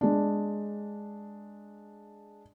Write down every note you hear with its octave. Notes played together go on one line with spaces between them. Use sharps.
G#3 D4